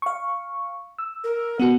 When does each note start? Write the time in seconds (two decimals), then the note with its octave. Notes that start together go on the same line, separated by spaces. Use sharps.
0.02 F5 C#6
0.99 E6
1.24 A#4
1.59 B3 F#4 F#5